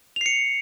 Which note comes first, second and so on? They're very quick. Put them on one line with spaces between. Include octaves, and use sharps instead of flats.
F7 C7 C#7